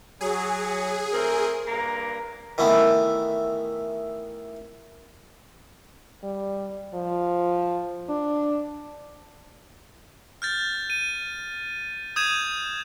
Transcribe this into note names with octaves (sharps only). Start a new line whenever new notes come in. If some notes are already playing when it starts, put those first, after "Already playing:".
F#3 G#4
A3 C4 A#4
G2 A#3 A#5
D#3 E3 A3 B3
G3
F3
D4
F6 G6 A6
D#7
D#6 G6 G#6 D#7 E7